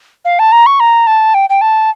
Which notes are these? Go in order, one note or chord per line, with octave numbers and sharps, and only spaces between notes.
F5
A5
A#5
C#6
A#5
A5
G5
G5
A5